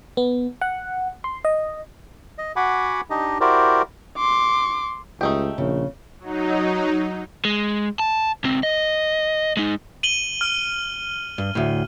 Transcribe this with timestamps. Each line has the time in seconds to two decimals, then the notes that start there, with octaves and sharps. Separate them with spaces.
0.17 B3
0.61 F#5
1.24 C6
1.45 D#5
2.38 D#5
2.56 F#4 F#5 G#5 B5 D6
3.10 D4 D#4 G4 D#5
3.40 E4 F#4 G4 A#4 C5 D5
4.17 C6 D6
5.21 C#2 A3 D#4 G4
5.58 A#1 C#3
6.19 F#3 D#4
7.45 G#3
7.99 A5
8.44 C#2 C4
8.63 D#5
9.57 G#3 D#4
10.03 D#7 F#7 G7
10.41 F6
11.38 G2
11.55 D2 A2